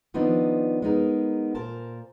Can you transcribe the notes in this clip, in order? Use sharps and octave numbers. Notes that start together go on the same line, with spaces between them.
D#3 F3 B3 C4 D4 D#4
G#3 B3 D#4 A#4
A#2 A#4 C5 A5